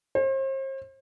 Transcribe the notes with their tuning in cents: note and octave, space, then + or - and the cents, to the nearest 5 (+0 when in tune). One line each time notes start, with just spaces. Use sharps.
C5 +40